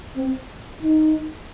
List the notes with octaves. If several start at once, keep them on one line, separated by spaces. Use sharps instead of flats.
C4
D#4